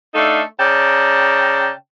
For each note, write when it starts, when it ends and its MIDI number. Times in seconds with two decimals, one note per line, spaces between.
0.15 0.42 57
0.15 0.42 62
0.15 0.42 63
0.15 0.42 69
0.15 0.42 76
0.15 0.42 77
0.59 1.70 49
0.59 1.70 74
0.59 1.70 79
0.59 1.70 81
0.59 1.70 82